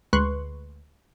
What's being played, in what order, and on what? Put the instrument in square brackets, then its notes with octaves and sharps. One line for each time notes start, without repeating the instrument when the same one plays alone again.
[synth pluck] D2 G#3 B4 C6 C#6 F#6